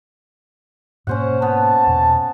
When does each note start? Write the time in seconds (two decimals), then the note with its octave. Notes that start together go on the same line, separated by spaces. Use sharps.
1.07 G#2 B2 A#3 C#4 C5 F#5
1.42 B3 A5
1.87 E2 B2